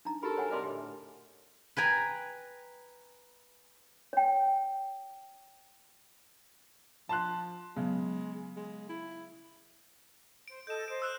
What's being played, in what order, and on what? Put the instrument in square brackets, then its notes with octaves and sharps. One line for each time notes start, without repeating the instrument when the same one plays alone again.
[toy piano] D4 D#4 A#5
[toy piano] F#4 G4 B5 [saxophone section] A4 A#4
[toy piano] C#5 F#5 G#5
[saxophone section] C3 G3 A#4 [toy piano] D#5 C6
[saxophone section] A2 D3 [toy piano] G4
[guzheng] B4 G5 G#5 A#5
[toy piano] C#5 G5
[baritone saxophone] F3 [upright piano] A5 C6 F#6
[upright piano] C#3 [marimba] F#3 B3 [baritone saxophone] G#3
[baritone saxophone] G#3
E4
[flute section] C5 [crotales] D7
[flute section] A4 D#5 [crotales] G6 E7
[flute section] C5 D#5 [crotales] D7
[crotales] E6 F#6 E7